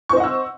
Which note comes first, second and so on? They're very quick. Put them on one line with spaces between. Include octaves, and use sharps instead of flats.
C#6 C5 D#5 F#5 E6